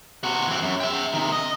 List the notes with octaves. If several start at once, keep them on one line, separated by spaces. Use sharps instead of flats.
C3 F#4
E3 C4
F#2
E5 G5
C3 D#3
D#5